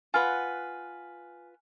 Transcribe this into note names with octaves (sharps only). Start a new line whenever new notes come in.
F4 B4 F#5 G#5 F6